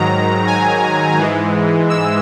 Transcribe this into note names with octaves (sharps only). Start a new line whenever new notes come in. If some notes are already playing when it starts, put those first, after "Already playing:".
Already playing: G#2 D#3 F#3 A#5
G#5
G#2 E3 G#3
E6